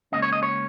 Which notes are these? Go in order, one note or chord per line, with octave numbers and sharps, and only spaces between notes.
C#2 C#3 A#3 C#4 D#5
C#5
D#5
C#5